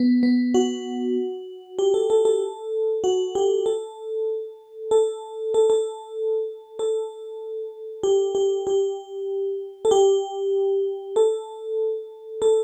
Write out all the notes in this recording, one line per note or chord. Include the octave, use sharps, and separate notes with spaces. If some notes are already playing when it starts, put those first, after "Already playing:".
Already playing: B3
B3
F#4
G4
A4
A4
A4
F#4
G4
A4
A4
A4
A4
A4
G4
G4
G4
A4
G4
A4
A4